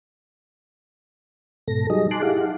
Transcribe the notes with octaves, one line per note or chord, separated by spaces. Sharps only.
G#2 B2 A4 A#6
F#3 G3 D#4 G#4 D#5
G#5 A5 C6 D6 F#6
D#4 E4 G4 G#4 F5 F#5